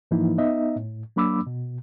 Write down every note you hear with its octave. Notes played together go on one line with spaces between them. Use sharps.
G#2 E3 F3 A#3 D#4 E4
B3 D#4 D#5 E5
A2
F#3 A#3 D4 B5 D6 E6
B2